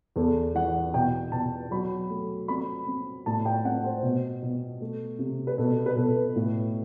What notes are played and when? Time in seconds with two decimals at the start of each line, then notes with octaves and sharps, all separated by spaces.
0.16 E2 A4
0.54 E3 F#5
0.94 B2 G5
1.32 B2 A5
1.71 F#3 B5
2.09 A3
2.48 C4 B5
2.87 C4
3.26 A2 A5
3.45 G5
3.64 C4 F#5
3.84 C5
4.03 B2
4.42 B2
4.80 A3
5.19 C3
5.47 B4
5.58 B2 A4
5.86 B4
5.96 B2 A4
6.36 A2